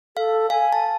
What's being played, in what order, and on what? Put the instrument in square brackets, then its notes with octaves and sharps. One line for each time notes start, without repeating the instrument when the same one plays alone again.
[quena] A4 [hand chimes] F5
[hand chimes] F5 [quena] G#5
[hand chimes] A5